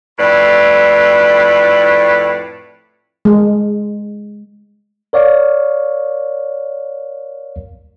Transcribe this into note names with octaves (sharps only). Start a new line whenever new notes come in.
F2 A2 B4 D5
G#3
A#4 C#5 D5 F5